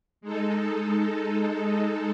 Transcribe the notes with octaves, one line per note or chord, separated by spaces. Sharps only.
G#3 D#4 A4